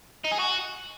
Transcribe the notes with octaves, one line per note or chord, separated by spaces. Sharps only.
D#4
G#4
F#4